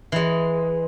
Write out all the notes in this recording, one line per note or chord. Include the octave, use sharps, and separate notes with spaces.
E3 G#3